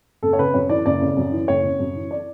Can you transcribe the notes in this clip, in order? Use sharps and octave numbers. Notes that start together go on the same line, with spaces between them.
F#1 A4
C#5
C#3 B4
F#2 C#5
E3 D5
F#1 D5
C#3
F#2
E3
F#1 C#5
C#3
F#2
E3
D5